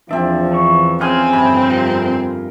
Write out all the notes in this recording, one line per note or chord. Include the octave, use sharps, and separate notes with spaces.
E2 F3 C4 D4 E5
E3 C#6
C#3 C4 G#4 G#5 C6 F6
G1 F2 C3 B5
G3 F4 A#4